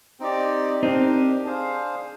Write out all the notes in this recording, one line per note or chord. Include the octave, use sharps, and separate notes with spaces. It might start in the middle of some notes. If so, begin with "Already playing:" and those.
C4 D#4 G4 D5
C4 D4 D#4 G4 A#4
D4 G#4 C5 F5